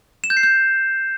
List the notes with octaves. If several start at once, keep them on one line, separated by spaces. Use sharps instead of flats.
E7
G6
C7
G6